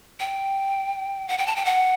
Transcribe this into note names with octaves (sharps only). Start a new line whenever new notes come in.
G5
F#5
G5
A5
G5
F#5